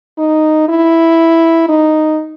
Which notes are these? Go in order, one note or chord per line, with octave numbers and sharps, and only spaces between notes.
D#4
E4
D#4